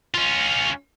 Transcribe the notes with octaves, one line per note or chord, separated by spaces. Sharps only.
C#4 F4